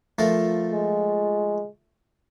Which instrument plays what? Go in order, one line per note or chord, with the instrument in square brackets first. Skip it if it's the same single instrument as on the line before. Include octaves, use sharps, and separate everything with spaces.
[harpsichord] F3 A3 A#4
[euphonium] G#3